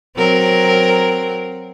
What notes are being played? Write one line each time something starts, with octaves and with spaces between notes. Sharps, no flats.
F#3 C4 A#4